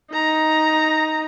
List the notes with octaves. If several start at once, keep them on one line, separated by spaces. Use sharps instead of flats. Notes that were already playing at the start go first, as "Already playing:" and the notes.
D#4 A#5